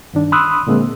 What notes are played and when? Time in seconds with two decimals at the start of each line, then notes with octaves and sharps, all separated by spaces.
0.14 G2 D#3 D4
0.32 B5 C6 D#6 E6 F#6
0.67 A#2 D3 G#3 A#3 C4